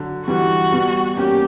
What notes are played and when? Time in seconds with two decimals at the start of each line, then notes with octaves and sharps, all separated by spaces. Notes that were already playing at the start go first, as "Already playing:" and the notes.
Already playing: D3 F#3
0.27 E3 G3 F#4
0.72 G3 B3
1.17 A#3 C#4 G4